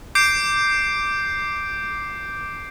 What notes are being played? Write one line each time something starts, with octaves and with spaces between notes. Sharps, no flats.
D6 G6 C7 D7